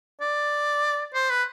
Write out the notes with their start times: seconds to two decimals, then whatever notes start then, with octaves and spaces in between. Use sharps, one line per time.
0.21 D5
1.14 C5
1.30 B4